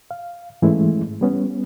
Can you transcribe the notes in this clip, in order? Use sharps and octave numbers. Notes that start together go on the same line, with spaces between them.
F5
G#2 E3 G#3 A3 C#4 E4
G3 B3 C#4